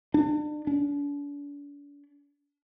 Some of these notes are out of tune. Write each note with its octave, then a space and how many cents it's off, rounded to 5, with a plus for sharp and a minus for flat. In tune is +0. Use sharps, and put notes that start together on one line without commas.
D4 +35
D4 -40